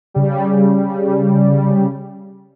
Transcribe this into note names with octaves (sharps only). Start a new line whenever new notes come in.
C#3 G3